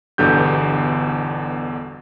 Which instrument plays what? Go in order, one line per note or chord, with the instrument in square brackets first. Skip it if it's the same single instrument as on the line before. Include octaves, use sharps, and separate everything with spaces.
[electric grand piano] G1 E2 B2 D3 G4 G6